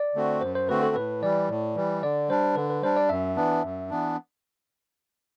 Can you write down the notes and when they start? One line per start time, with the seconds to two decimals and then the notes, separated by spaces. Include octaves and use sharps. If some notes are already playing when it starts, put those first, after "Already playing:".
Already playing: D5
0.15 D3 A3 C4 F#4
0.41 F#2 C5
0.55 C5
0.69 D3 A3 C4 F#4 B4
0.83 A4
0.96 A2 B4
1.22 E3 G3 D5
1.49 A2
1.76 E3 G3
2.02 D3 D5
2.29 G3 D4 C5
2.56 D3 B4
2.70 B4
2.82 G3 D4 C5
2.96 D5
3.09 F#2 E5
3.36 E3 B3 D4
3.64 F#2
3.90 E3 B3 D4